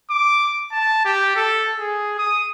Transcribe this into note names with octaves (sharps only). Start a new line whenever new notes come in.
D6
A5
G4
A4
G#4
D#6